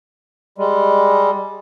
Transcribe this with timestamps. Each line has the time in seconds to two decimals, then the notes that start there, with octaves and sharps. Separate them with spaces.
0.58 G3 G#3